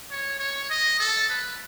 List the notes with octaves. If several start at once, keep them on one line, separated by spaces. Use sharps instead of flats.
C#5
C#5
D#5
A4
B4